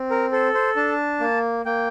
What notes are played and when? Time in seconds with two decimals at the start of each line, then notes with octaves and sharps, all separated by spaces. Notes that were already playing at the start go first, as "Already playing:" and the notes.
Already playing: C4
0.10 A#4
0.32 A4 C5
0.54 C5
0.76 D4 A5
1.20 A#3
1.65 A#3 G5